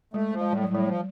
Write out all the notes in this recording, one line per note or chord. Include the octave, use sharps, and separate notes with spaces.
G#3 A3
F3
G#3
A2 G3
F#3
A2
G3
F3